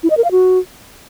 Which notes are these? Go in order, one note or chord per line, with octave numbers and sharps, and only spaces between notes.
E4
D#5
A#4
F5
F#4